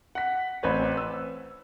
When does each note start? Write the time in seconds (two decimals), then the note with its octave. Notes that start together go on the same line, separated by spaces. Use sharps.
0.15 F#5 B6
0.63 A1 C4 B4 C#5
0.97 E6